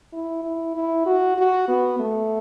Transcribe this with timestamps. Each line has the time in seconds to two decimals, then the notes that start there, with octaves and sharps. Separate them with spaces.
0.13 E4
0.43 E4
0.75 E4
1.06 F#4
1.38 F#4
1.68 B3
2.00 A3